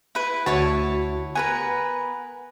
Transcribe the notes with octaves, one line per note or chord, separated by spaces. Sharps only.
E4 B4
D2 E4 F#4 C#5 A5
B3 A#4 B4 G#5